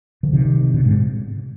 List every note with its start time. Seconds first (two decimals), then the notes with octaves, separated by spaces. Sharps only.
0.23 D3 F3
0.33 C3 D#3
0.74 B2 D3
0.84 G#2 C3